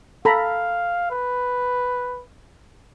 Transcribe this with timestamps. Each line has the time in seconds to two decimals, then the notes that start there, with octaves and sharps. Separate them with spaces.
0.25 A4 F5 A#5 B5
1.11 B4